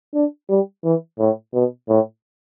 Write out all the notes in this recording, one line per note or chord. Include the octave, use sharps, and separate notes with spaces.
D4
G3
E3
A2
B2
A2